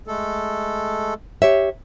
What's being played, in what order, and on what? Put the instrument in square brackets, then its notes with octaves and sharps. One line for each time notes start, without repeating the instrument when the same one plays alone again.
[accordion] G#3 A3 A4
[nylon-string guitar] G4 C#5 E5